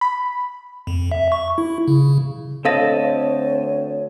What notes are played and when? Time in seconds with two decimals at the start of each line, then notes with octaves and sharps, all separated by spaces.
0.01 B5
0.87 F2
1.12 E5
1.32 C#6
1.58 E4
1.88 C#3
2.65 D2 C4 A4 C#5 D#5 F5 A5 A#6